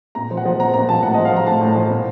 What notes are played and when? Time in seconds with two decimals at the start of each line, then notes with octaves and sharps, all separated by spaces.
0.15 A#2 A#5
0.31 F3
0.37 F#5
0.45 F3
0.60 A#2 A#5
0.74 A#2 A#5
0.89 F3 A5
1.03 A2 F#5
1.14 F3 D#5
1.25 F5
1.32 F3 A#5
1.47 A2 A5
1.61 A2
1.75 F3
1.90 A#2